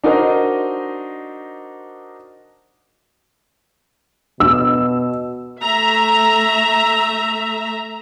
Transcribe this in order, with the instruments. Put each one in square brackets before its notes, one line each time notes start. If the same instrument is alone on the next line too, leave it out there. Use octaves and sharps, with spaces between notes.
[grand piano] D4 D#4 F#4 A#4 C5 D#5
[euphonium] B2 [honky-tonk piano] E6
[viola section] A3 E5 A#5